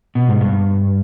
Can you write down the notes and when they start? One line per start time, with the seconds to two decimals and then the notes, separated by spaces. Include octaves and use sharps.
0.15 B2
0.28 G#2
0.41 G2